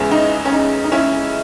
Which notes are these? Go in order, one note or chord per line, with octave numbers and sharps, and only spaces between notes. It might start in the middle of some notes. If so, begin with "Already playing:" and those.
Already playing: E2 C#3 G#3 B3 C#4 E4
D#4
C#4
D#4
D#4
C#4 E4